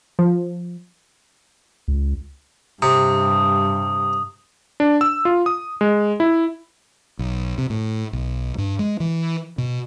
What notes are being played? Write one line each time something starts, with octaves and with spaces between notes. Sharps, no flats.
F3
C#2
G2 C3 D#6
D4
E6
F4
D#6
G#3
E4
B1
C3
A2
B1
G2
G#3
E3
B2